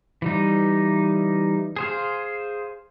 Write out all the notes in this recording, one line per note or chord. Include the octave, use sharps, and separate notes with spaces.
E3 G3 D#4
G#4 C5 F5